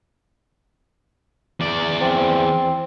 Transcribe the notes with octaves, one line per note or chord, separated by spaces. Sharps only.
E2 D5
C4